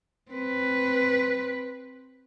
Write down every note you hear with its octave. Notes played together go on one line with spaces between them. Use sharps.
C4 B4